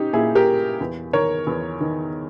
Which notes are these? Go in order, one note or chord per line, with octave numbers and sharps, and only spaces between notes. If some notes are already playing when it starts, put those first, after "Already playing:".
Already playing: C#4 D#4 G4
A#2 E4 G#4
G4 A#4
E2
D#3 A#4 C#5
E2
D#3